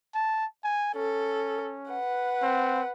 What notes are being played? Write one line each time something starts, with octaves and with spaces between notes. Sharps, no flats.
A5
G#5
C#4 A4
B4 F#5
C4